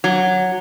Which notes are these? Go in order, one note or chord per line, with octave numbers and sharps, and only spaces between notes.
F#3